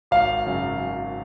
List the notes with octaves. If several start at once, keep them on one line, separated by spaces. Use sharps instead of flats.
G#1 F5
F#2 C#3 F#3